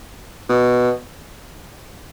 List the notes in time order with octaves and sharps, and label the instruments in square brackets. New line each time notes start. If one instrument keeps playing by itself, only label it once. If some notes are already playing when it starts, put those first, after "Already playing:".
[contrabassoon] B2